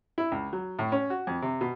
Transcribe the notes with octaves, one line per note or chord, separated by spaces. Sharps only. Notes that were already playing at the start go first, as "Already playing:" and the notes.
E4
C#2
F#3
A2
C#4
F#4
F2
C3
B2